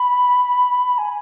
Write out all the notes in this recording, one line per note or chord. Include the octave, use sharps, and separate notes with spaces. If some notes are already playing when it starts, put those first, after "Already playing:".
Already playing: B5
G#5